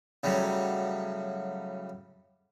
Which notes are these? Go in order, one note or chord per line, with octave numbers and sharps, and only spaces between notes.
A2 C#3 F#3 G3